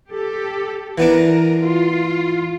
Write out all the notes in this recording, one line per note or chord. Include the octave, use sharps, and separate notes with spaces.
G4 A4
E3 B3 D4 A#4
F4